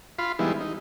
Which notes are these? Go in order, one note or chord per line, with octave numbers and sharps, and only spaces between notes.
F4 F5 B5 C6
E3 G3 G#3 B3 D#4 E4
D#4